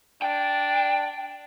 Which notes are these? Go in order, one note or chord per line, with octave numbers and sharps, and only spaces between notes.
D4 G5